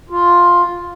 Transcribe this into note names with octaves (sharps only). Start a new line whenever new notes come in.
F4